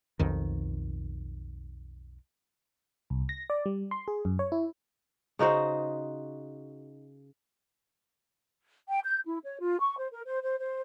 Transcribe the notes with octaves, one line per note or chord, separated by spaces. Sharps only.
B1 F2 D#3
C2
A#6
D5
G3
C6
G#4
F#2
C#5
E4
C#3 D#4 F#4 C5
G5
G6
E4
C#5
F4
C#6
C5
A#4
C5
C5
C5